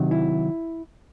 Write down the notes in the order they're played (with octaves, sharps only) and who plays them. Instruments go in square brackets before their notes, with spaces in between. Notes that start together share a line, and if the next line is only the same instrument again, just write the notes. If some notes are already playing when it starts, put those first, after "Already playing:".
Already playing: [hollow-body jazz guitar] C3 D#3 F#3
E4